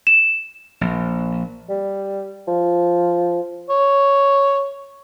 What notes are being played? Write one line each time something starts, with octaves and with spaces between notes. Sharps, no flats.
E7
A#1
G3
F3
C#5